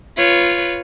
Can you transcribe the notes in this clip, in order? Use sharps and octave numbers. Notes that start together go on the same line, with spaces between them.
F4 B4 C#5